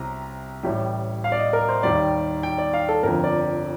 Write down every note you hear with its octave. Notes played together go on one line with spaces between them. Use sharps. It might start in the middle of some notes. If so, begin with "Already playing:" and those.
Already playing: C2 C3 G3 A#5
A1 A2 G3
F5
D5
D#5
A#4
C5
D#2 D#3 G3 D5
G5
D5
F5
A4
G1 F2 D3 A#4
D5